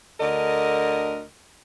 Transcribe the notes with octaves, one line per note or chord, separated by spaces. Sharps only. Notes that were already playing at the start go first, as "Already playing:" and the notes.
D2 D3 A#4 D#5